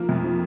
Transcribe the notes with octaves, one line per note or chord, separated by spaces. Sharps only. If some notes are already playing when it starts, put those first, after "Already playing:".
Already playing: F3 A#3
F2
F3